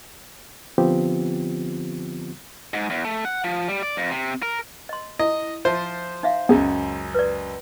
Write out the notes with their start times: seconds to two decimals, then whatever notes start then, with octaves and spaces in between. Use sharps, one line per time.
0.78 D3 F3 B3 C4 F4 G4
2.74 G#2
2.90 E2
3.05 A3
3.25 F#5
3.44 F3
3.68 G3
3.83 D5
3.97 F2
4.10 C3
4.42 A#4
4.89 D#5 C6
5.19 E4 D#5
5.65 F3 F4 C5 E5
6.23 D#4 E5 F5
6.49 C#2 F#2 B3 G#4
7.14 B4 D5